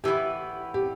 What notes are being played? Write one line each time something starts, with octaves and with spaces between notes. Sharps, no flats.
A2 E3 B3 G4
G4